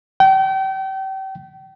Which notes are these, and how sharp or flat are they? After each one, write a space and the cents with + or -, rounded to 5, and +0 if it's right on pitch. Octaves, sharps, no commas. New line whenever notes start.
G5 -35